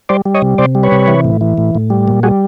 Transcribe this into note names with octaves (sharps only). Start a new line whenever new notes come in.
G3 C5 D5
G3
C#5 D#5
C3
C3 C5 D5
G3
B4 C#5
C3
E3
A2
E3
A2
A2
G3
A#2
G3 F#4 G#4